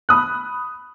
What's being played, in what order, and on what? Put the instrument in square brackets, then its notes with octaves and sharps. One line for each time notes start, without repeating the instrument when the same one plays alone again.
[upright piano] B5 D#6 F#6